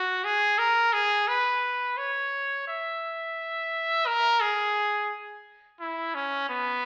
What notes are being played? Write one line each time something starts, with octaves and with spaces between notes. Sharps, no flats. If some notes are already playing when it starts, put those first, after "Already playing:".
Already playing: F#4
G#4
A#4
G#4
B4
C#5
E5
A#4
G#4
E4
C#4
B3